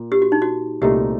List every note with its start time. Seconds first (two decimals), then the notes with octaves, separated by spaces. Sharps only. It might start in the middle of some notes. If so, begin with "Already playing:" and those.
Already playing: A#2
0.12 G4
0.22 F#4
0.32 D#4
0.42 F#4
0.82 C2 A#2 A3 D#4 G4